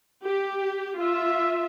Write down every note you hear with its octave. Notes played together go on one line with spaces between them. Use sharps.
G4
F4 E5